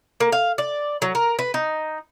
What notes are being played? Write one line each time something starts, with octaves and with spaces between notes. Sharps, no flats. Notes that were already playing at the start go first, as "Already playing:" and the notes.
A#3
F5
D5
F#3
A#4
B4
D#4